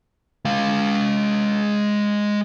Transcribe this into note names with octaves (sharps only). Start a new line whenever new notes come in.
G#3 F5